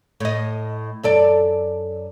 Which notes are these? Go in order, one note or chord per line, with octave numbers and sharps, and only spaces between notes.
A2 D#5
F#2 A4 D5